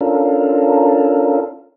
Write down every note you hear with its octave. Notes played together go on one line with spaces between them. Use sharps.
C#4 D4 F4 A4 A#4